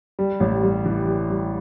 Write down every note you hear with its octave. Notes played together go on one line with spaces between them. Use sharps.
G3
A1
G3
E3
G3
G3